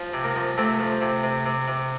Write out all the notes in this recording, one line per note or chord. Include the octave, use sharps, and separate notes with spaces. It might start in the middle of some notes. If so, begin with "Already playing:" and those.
Already playing: F3
C3
A#3
F3
C3 A3 C4
F3
C3
C3
C3
C3